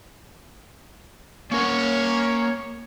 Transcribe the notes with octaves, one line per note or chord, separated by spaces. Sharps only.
A#3 C#4 A#4 C#5 F#5